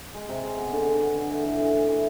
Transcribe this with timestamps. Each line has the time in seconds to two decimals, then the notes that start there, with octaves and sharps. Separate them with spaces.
0.14 G#3
0.29 C3
0.43 G#3
0.58 B3
0.72 D3
0.86 D3
1.01 B3
1.16 D3
1.30 A3
1.45 A2
1.59 E3
1.74 E3
1.88 E3